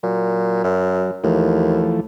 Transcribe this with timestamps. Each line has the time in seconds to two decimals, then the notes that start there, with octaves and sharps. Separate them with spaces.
0.03 A#2 F#3
0.64 F#2
1.24 D#2 E3 F3 A3